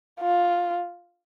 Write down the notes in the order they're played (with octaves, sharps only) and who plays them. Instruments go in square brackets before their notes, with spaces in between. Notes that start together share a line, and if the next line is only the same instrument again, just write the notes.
[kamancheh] F4